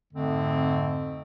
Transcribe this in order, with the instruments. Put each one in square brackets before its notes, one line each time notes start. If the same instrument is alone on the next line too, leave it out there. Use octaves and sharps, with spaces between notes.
[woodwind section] F2 G#2 D3 A3 C4